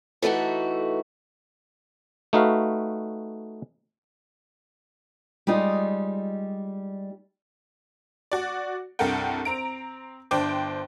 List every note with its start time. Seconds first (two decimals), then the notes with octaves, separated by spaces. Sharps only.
0.22 E3 A3 D#4 F#4
2.33 A3 D#4 F#4 B4 F5
5.47 G3 G#3 D#4 F4
8.32 F#4 D5
8.99 C2 G2 A4 A#4 F#5 G5
9.45 C4 A#5 D7
10.31 G1 D4 C5 G5 D6